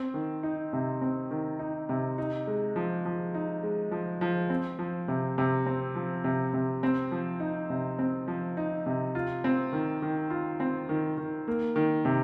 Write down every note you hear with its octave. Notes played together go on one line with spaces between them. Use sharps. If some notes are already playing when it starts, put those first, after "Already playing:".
Already playing: C4
D#3
D#4
C3
C4
D#3
D#4
C3
D#4
G#3
F3
F3
D#4
G#3
F3
F3
C4
F3
C3
C3
C4
F3
C3
C3
C4
F3
D#4
C3
C4
F3
D#4
C3
F4
C4
D#3
D#3
F4
C4
D#3
D#3
A#3
D#3
C3